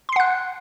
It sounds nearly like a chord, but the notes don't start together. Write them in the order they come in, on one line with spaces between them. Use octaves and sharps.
C6 C7 F#5 F#6